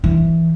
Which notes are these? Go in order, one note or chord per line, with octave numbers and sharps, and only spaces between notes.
E3